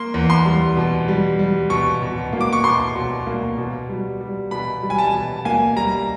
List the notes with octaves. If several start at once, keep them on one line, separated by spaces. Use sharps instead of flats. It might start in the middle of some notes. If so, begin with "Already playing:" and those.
Already playing: A#3 C6
E2
C6
G3
B2
G3
G3
B2 C#6
B2
A#3
D6
C#6
B2 C6
B2
A#3
B2
G3
G3
B2 B5
G3
G#5
A5
B2
A#3 G#5
G3 A#5